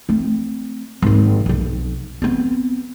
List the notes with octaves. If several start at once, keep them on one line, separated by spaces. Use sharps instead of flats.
A3 C4
G#1 D#2
B1 F2
B3 C4